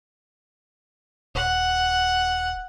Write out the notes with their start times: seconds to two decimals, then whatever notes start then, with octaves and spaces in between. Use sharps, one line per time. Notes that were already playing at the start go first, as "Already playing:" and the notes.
1.35 D#1 F#5